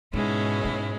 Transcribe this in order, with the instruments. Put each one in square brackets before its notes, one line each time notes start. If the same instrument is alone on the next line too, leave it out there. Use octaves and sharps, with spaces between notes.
[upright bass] G#2 [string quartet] B2 G#3 C#4 E4
[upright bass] G#2